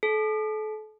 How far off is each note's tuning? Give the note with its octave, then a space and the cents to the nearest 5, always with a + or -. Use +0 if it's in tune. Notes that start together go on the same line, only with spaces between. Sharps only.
A4 -35